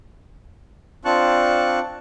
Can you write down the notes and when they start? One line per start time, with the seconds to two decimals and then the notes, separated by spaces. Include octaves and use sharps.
1.05 C4 D4 F4 A5 C#6 F#6